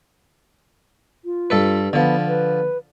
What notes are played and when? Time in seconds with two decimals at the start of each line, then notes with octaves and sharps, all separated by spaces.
1.25 F4
1.50 G2 A4 B4
1.93 D3 F3 B3
2.28 B4